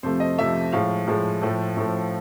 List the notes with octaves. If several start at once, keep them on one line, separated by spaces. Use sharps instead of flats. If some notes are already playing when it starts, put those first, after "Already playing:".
F2 C3 F3 A3 C5
D#5
F2 C3 F3 A3 E5
A2 F3 G#3 F5
A2 F3 G#3
A2 F3 A3
A2 F3 A3